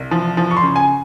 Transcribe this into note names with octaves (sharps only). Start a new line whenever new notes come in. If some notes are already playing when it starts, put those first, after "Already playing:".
Already playing: C2
F3
F3
C#6
C6
C#3
G#5